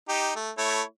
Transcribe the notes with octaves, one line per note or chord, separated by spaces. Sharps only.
D#4 G4
A3
A3 E4 C#5